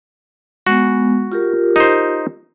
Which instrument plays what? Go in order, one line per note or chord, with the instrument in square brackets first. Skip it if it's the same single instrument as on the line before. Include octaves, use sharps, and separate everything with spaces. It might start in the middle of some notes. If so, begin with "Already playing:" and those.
[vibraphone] G#3 B3 [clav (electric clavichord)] F#4
[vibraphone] F4 G4 A#4
[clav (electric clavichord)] D#4 C5